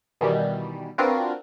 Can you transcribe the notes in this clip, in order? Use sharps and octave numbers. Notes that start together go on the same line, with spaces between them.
B2 D#3 E3 G3
C4 D4 F4 F#4 A#4 B4